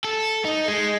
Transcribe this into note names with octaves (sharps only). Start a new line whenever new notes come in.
A4
D#4
G#3